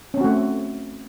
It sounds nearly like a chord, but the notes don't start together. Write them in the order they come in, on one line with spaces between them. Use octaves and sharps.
C#4 C4 F#4 A3